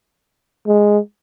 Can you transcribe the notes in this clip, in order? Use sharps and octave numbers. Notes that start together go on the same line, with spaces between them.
G#3